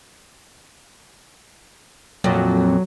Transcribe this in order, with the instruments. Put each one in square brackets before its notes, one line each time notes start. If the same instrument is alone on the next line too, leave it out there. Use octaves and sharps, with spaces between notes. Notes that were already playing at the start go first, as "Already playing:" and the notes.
[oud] F2 A#2 [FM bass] F#3